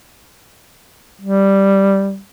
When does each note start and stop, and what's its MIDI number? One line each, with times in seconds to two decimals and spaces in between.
1.21 2.18 55